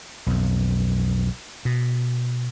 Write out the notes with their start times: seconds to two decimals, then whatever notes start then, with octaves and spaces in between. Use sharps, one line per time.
0.27 B1 F2
1.65 B2